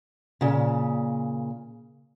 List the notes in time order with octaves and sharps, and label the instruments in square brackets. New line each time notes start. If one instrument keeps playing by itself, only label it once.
[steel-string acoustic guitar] A#2 C#3